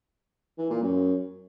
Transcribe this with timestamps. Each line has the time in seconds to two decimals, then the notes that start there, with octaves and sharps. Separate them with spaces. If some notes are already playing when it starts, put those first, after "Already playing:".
0.58 E3
0.70 A#2
0.82 F#2